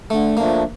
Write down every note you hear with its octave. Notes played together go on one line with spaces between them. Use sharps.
D3 A3
F3 A3 A#3 D4